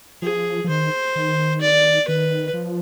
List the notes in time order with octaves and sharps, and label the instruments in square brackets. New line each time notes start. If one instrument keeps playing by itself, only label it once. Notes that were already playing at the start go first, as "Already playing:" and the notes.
[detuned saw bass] F3 [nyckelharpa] G#4
[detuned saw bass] F3
[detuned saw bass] D#3 [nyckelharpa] C5
[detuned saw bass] D#3
[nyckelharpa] D5
[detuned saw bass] D#3 [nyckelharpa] B4
[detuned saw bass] F3